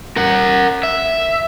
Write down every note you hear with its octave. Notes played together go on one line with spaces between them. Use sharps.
A#4 F#5
E5